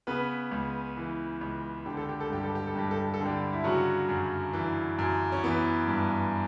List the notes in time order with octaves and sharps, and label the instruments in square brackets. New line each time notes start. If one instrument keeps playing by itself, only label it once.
[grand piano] C#3 B3 B4
C#2
E3
C#2
D3 G4
A4
G4
A4
G2 G4
A4
G4
A4
G2 G4
A4
G4
A4
D3
G3 G4
E4
C#3 F#3 F#4
F#2
E3
F#2
C#4
E3 B3
G2